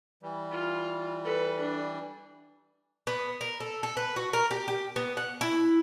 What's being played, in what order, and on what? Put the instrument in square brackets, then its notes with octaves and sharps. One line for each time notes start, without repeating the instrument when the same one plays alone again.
[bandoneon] E3 G3
[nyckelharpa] F4
A4 B4
D4
[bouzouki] B3
A#4
A4
A4
B4
F#4
A#4
G4
G4
B3
F#5
E4